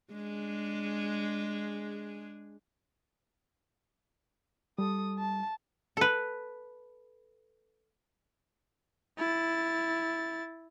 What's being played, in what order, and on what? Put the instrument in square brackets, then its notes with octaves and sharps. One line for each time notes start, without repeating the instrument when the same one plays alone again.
[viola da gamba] G#3 D4 G#4
[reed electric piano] G3 [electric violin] A4 D#6
[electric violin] A5
[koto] A4 B4
[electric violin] E4 A6